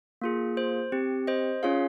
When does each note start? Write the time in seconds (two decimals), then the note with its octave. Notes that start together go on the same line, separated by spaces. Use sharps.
0.22 A#3 F4 G#4
0.57 C5
0.92 C4 G4
1.27 C5 D#5
1.63 C#4 F4 G#4 C#5 F5